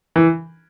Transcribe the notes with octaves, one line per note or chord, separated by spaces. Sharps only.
E3